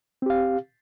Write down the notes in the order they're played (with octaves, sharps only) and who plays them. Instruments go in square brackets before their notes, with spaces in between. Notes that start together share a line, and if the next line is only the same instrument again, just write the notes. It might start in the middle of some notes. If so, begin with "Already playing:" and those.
[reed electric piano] C4
G4
F5